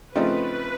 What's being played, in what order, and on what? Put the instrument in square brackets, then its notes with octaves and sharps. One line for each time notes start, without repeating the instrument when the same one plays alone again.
[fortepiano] C#3 F3 A3 C4 D#4 [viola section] B4